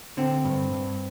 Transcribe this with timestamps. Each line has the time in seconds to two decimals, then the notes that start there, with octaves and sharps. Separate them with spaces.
0.17 D3 C4
0.45 G2
0.72 G2